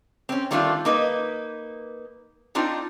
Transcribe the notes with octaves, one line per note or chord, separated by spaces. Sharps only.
C4 C#4
D#3 G3 A3 D4 F4
A#3 D#4 B4
C4 D4 D#4 F4 C5